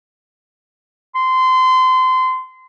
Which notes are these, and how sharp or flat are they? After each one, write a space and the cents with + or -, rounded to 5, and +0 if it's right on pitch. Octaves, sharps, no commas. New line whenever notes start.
C6 -25